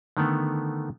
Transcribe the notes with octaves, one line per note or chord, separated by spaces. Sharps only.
D3 D#3 A3 B3